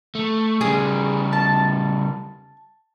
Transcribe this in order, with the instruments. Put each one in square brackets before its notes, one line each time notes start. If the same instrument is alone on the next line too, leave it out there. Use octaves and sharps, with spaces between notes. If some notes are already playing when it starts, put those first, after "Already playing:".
[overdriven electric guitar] A3
[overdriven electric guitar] C#3 G3 [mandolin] G#4
[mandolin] A5